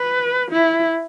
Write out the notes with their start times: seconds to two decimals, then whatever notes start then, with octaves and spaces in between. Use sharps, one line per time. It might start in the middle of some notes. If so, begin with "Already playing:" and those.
Already playing: B4
0.51 E4